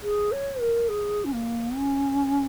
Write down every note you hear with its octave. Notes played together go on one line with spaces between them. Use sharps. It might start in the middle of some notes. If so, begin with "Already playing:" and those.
G#4
C#5
A#4
G#4
C#4
A#3
C#4